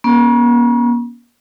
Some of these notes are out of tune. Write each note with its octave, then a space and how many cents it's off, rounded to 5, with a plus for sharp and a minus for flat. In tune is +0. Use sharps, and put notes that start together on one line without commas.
A#3 +45 C#4 +0